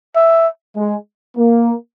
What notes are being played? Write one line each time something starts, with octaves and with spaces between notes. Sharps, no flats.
E5
G#3
A#3